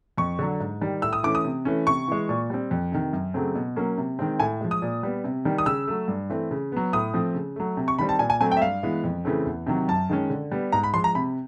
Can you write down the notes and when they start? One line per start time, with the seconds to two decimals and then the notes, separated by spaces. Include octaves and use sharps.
0.18 F2 C#6
0.39 D3 F#3
0.60 G#2
0.81 D#3 G3
1.02 A2 E6
1.13 D#6
1.23 E3 A3 C#4 D6
1.35 D#6
1.44 C3
1.65 E3 A3 C#4
1.87 C3 C#6
2.08 E3 G#3
2.29 A#2
2.50 G3 C4
2.71 F2
2.92 C3 D#3
3.13 F#2
3.34 C#3 F#3 A3 C4
3.55 B2
3.76 F#3 A#3 C#4
3.98 C3
4.19 D#3 G#3 C4
4.40 A2 G#5
4.61 F3 G#3
4.71 D#6
4.82 A#2
5.03 G3 B3
5.24 C3
5.45 D#3 G3
5.58 D#6
5.66 C#3 E6
5.88 F#3 A3
6.08 G2
6.30 E3 A3 C4
6.51 C#3
6.72 F#3 B3
6.93 A2 D#6
7.14 F3 A3 C4
7.35 C#3
7.56 F#3 A3
7.77 C3
7.88 C#6
7.99 D#3 G3 C4 B5
8.09 A5
8.19 A#2 G#5
8.30 G#5
8.40 F#3 A3 C4 G#5
8.51 G5
8.57 E5
8.62 G2 F5
8.83 E3 G#3 B3
9.04 F2
9.25 C#3 E3 A3 C4
9.46 E2
9.67 C3 D#3 F#3
9.88 F#2 A5
10.09 D#3 G#3 C#4
10.30 D3
10.51 G3 B3
10.72 G#2 A#5
10.84 B5
10.94 F3 G#3 C6
11.04 A#5
11.15 C3 B5